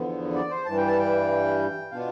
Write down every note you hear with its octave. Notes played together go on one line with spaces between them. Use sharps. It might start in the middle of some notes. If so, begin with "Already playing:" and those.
Already playing: E2 D3 F3 B3
D5
C5
G2 E3 G3 A5
G5
A5
G5
B2 B3 D4 F4 F5